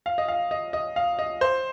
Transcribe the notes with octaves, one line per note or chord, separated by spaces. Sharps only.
F5
D#5
F5
D#5
D#5
F5
D#5
C5